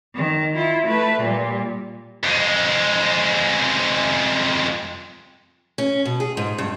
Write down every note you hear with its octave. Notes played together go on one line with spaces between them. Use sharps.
D#3
E4 F4
A3 B4
A#2 G3
F2 G#3
C#4
B2
G#4
G#2
G2